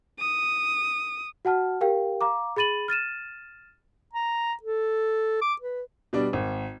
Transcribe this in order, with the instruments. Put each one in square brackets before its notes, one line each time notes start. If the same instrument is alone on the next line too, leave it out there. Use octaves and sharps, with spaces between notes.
[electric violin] D#6
[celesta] F#4 F#5 A5 F6
G4 A#4 F5 G5
F5 A#5 D6
G#4 B5 A6 D#7 F#7
F6 A6 D#7 E7
[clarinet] A#5
A4
D6
B4
[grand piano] B2 G3 D4
G#1